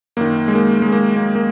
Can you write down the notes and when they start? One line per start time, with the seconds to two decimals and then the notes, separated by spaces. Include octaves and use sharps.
0.17 F#2 D#3 A#3
0.48 G#3
0.55 A#3
0.82 G#3
0.92 A#3
1.17 A#3
1.35 A#3